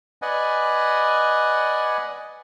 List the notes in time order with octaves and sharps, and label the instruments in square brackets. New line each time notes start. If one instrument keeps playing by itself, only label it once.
[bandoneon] B4 D5 D#5 F#5 G#5